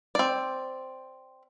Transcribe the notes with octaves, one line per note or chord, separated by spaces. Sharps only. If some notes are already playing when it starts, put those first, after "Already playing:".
C4 D5